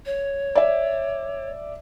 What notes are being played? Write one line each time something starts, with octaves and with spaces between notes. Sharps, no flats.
C#5
D5 E5